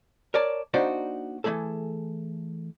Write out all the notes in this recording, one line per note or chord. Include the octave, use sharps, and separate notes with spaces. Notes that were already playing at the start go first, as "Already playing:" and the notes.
A#4 C#5 D5 A5
A#3 D4 D#4 F#4 C5 D5
E3 G#3 A3 G#4 A4